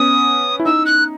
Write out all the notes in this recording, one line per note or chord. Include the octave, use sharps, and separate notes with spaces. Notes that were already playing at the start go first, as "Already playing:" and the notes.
Already playing: B3 C#4 D#6
E4
D#4 E6
F#6